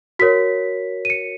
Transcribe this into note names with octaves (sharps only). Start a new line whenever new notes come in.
F#4 A#4 C#5 B6
D#7
C#7